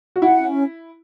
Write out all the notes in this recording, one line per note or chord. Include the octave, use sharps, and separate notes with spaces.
F#4
E4 F#5
C#4